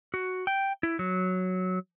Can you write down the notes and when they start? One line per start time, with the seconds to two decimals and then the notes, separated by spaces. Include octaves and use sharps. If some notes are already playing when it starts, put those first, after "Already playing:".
0.14 F#4
0.47 G5
0.83 E4
0.99 F#3